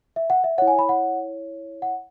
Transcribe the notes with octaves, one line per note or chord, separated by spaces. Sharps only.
E5
F#5
E5
E4 C#5 F#5
G#5
B5
F#5
F#5